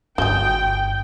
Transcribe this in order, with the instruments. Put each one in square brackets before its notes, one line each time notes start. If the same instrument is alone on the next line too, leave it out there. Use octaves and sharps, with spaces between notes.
[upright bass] G1 [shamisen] F#4 G#4 [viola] G5 [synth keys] G6